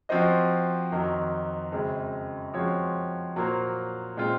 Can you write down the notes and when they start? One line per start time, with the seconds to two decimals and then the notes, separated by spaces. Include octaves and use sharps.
0.09 F3 C4 F#4 C5 D#5
0.92 F2 D#3 F#3
1.72 F#2 C#3 G#3 C4
2.54 F3 G#3 C4 F#4 C#5
3.36 A#2 F#3 A#3 F4 C5
4.17 A#2 G#3 C4 F4